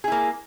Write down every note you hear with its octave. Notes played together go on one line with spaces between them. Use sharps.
A#3 E4 G#4